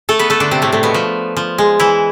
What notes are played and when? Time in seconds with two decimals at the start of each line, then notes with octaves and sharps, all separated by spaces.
0.09 A3 A4
0.19 B3 B4
0.30 A3 A4
0.40 D3 D4
0.51 C3 C4
0.62 A2 A3
0.72 A2 A3
0.83 B2 B3
0.94 F3
1.37 F3
1.58 G#3
1.80 E3 E4